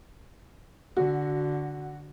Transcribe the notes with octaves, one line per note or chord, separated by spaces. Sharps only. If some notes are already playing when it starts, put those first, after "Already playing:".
D3 F#4